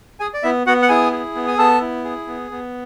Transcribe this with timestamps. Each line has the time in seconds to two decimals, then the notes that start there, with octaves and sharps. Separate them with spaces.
0.20 G#4 G#5
0.34 D5
0.43 B3 E4 E5
0.66 B3 F#4 F#5
0.82 F#5
0.89 E4 G#4 G#5
1.12 G#4
1.35 B3
1.48 G#5
1.58 B3 A4 A5
1.81 E4
2.04 G#4
2.27 B3
2.51 B3